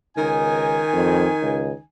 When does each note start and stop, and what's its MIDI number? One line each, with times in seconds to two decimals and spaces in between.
0.17 0.83 37
0.17 1.81 51
0.17 1.81 63
0.17 1.81 80
0.93 1.28 41
1.42 1.71 37